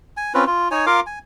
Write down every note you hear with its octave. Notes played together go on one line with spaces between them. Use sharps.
G#5
C4 C#4 F4 B4
F4
D#4 C#5 G#5
F4 A#4 F5 D6
G#5